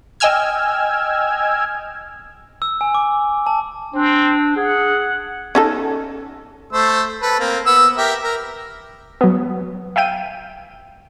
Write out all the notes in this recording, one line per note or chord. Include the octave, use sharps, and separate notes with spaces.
D#5 G5 G#5 E6 F6 G#6
E6
G#5
D6
A5
C4 D4
G#4 F#5
C#4 D#4 A4
A3 C5 E6
A4 B4
A#3 C4
B3 E6
G4 A#4 E5
A#4
F#3 B3
E5 F5 G5 D#7